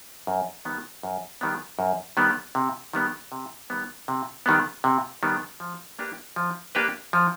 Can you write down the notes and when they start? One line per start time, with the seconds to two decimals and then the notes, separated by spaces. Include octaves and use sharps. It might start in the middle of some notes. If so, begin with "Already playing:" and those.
0.27 F#2
0.65 D#3 G3 B3
1.03 F#2
1.41 D#3 G3 B3
1.79 F#2
2.17 D#3 G3 B3
2.55 C3
2.93 D#3 G3 B3
3.32 C3
3.70 D#3 G3 B3
4.08 C3
4.46 D#3 G3 B3
4.84 C3
5.23 D#3 G3 B3
5.60 F3
5.99 A#3 D4 G4 B4
6.36 F3
6.75 A#3 D4 G4 B4
7.13 F3